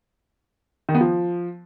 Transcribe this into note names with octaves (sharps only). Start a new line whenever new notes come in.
D#3
B3
F3